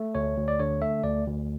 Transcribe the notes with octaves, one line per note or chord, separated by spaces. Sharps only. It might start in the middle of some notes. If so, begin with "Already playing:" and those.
Already playing: A3
D2 C#5
D2
D5
D3 C#5
A3 E5
D2 D5
D2